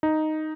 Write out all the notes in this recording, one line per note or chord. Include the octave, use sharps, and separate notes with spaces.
D#4